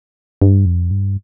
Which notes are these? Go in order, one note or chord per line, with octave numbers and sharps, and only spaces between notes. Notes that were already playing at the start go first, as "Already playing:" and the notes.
G2
F2
G2